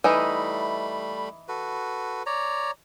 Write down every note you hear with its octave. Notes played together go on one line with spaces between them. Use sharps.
E3 G3 A3 D#4 B5
F#4 A4 B4
C#5 D5 A#5